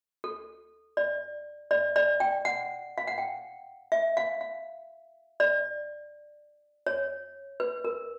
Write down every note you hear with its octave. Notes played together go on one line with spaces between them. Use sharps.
A4
D5
D5
D5
G5
F#5
F5
F#5
G5
E5
F5
F5
D5
C#5
B4
A#4